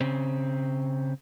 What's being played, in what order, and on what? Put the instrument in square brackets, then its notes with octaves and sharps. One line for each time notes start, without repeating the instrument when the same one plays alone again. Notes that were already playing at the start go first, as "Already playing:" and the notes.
[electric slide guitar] C#3 C4